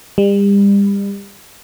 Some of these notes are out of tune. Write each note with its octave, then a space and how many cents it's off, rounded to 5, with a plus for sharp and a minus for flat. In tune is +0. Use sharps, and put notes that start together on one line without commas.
G3 +35